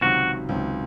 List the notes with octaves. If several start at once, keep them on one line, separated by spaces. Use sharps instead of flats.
C#2 C3 D#3 F#3 F#4
C#2 C3 D#3 F#3